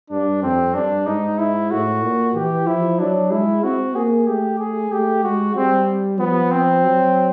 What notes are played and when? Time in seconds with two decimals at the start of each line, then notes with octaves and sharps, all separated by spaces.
0.10 G2 D4
0.43 F2 C4
0.75 G2 D4
1.06 G#2 D#4
1.39 E4
1.71 A2 F#4
2.03 A#2
2.35 E3 G4
2.67 F3 E4
2.99 F#3 D4
3.31 G#3 E4
3.64 C4 F#4
3.95 A#3 G#4
4.27 A3 G4
4.59 G#4
4.92 A3 G4
5.23 G#3 F#4
5.55 G3 C4
6.20 F3 B3
6.52 C4
6.84 F#3